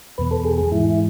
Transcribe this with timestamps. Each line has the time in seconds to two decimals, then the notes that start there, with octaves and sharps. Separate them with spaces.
0.18 E2 B2 B4
0.31 A4
0.44 G#4
0.58 G#4
0.72 G#2 E3 E4